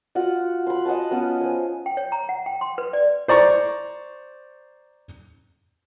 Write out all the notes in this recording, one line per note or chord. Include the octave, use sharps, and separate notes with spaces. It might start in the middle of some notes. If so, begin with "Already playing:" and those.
F4 F#4 F#5
B5 C6
D#5 F#5 G#5 A5
B3 C#4 F4 B4
C5 G#5
G5
C#5
A#5
F#5
G5
C6
B4
D5
C5 D5 A#5 C#6